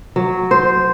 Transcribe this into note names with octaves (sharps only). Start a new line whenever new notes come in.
F#3
C5